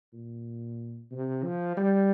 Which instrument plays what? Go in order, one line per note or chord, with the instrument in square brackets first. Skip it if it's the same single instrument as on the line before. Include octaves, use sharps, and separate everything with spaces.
[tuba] A#2
C3
F3
G3